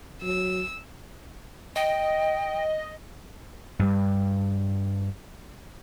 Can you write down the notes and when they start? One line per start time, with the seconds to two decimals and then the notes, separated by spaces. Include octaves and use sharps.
0.22 F#3 E6
1.76 D#5 G5
3.79 G2 G3